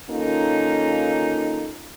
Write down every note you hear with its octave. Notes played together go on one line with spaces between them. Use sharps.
D#3 A#3 C#4 D#4 F4 A4